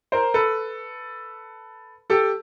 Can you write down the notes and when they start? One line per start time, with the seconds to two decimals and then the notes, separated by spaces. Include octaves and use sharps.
0.12 A#4 C5
0.34 A4 B4
2.10 G4 A4